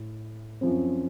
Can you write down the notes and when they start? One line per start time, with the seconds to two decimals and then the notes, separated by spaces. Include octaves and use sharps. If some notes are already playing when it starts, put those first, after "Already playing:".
Already playing: A2
0.61 F#2 F3 C4